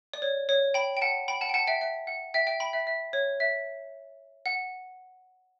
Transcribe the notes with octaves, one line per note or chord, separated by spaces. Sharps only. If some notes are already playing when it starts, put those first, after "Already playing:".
D5
C#5
C#5
G5 B5
G5
F#5 A5
G5 B5
F#5 A5
G5
F#5 A5
E5 G5
E5
F#5
E5 G5
E5 G5
G5 B5
E5
E5
C#5
E5
F#5